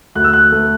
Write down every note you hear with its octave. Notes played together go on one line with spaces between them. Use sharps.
D2 F#6
E6
F#6
A3